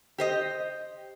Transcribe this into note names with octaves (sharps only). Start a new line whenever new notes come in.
G4 C5 D#5